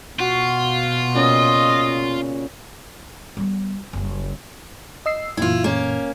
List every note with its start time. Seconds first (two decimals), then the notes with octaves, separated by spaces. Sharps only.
0.20 B2 F4 F#4
1.15 A#2 C#3 D#5
3.37 G3 B3
3.93 F#1 G3
5.06 D#5 E6 C7
5.37 F#2 A#2 E3 E4 F4
5.64 A#3 C#4